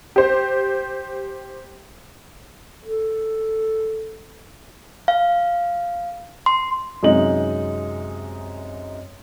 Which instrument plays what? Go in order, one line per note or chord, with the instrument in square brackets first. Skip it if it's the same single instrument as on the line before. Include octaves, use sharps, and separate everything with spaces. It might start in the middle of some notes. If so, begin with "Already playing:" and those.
[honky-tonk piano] G4 C5
[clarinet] A4
[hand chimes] F5
C6
[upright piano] F#2 C3 G#3 D#4 F#7